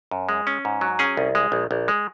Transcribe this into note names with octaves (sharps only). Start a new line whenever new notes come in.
F#2
G#3
C#4
G#2
F#3
C#4 G#4
C2
G#3
A#1
A#1
G#3